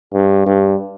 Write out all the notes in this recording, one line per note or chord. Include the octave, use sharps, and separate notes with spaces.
G2
G2